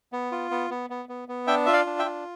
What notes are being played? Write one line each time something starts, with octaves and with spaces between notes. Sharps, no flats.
B3
F4
B3
B3
B3
B3
B3
D4 E5 G5
F4 E5
D5 F5
D4
E5 G5
F4